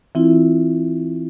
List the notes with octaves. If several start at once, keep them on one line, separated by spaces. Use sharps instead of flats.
E3 C4 E4 F4